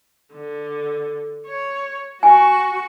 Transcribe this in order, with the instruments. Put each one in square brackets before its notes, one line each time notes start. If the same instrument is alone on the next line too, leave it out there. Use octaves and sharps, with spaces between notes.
[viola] D3
C#5
[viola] F#4 C#6 [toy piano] G#5